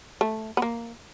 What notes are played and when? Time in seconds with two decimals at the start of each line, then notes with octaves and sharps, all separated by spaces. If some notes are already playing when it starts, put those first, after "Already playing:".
0.21 A3
0.57 B3
0.62 A#3